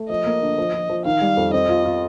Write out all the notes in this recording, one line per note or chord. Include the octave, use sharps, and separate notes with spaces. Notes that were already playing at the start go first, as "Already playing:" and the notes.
Already playing: A3
F3 D#5
A#3
D3
F3
F3
F3
D#3 F5
G3
F2
C4 D#5
F4
F4